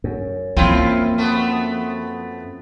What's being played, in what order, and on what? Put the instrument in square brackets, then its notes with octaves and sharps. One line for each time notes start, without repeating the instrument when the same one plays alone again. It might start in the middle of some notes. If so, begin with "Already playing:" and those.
[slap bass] F#2
[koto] F3 C4 [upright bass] A#3 C#4 [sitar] E4 F4
[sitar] A3 B3